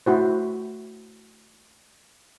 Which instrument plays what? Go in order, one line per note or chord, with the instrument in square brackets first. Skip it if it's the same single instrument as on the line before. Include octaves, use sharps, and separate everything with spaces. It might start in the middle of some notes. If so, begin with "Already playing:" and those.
[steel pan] A3 E4 F#4 C5